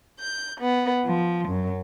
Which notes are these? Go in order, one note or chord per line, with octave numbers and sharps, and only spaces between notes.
G6
B3
F3
F#2